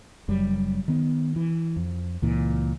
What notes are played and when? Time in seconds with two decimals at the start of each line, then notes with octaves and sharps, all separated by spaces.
0.28 F#1 F#2 G3
0.88 D#3 B3
1.36 E3
1.76 F2
2.22 C#2 A#2 E3